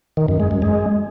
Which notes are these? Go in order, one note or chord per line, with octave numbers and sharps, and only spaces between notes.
D#3
F#2
G#3
F#2
G#3